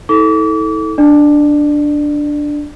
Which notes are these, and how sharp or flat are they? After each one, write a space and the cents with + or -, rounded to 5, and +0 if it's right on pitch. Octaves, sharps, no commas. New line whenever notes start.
E4 -45 A4 -5 D6 -35
D4 +0 D5 +30